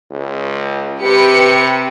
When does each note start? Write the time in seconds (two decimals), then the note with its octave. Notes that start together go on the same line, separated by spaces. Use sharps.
0.11 C#2
1.04 C3 G4 B4 C#7